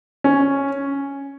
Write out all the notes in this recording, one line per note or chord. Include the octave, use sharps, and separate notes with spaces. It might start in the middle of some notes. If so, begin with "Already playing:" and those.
C#4